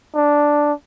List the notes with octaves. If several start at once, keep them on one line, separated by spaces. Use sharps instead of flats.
D4